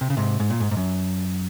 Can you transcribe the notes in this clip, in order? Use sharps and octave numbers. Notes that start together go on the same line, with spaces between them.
C3
C#3
G#2 C3
G#2
A#2
G#2
G#2
F#2